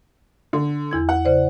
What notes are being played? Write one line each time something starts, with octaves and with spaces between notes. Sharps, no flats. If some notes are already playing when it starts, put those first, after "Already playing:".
D3
E2 E4 G#6
F#5
C#3 C5 D5